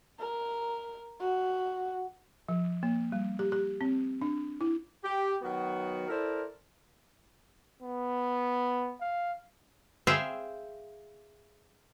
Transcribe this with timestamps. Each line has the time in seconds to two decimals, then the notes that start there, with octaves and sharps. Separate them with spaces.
0.20 A#4
1.20 F#4
2.49 F3
2.83 A#3
3.12 G3
3.39 G4
3.52 G4
3.81 C4
4.21 D4
4.61 E4
5.04 G4
5.42 D#3 F#3 B3 F#4
6.09 E4 A4 A#4 C5 D5
7.82 B3
9.01 F5
10.07 G#4 C5 E5 F5 G5